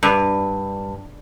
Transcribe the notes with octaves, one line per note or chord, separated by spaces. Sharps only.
G2